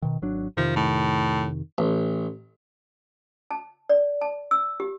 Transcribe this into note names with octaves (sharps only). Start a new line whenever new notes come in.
B2 D#3
G#1 F#3 D4
F2 C3 D#3 F3
A2
A1
A5
D5
A5
E6
G4